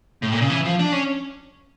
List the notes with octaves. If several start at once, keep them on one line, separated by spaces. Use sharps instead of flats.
A2
A#2
C#3
E3
F3
D4
C#4